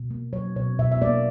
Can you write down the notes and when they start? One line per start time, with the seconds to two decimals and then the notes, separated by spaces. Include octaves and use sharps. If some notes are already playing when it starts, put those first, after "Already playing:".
Already playing: B2
0.10 A#3
0.33 F#3 C#5
0.56 B2 C#5
0.79 B2 E5
0.92 E5
1.02 A#3 D5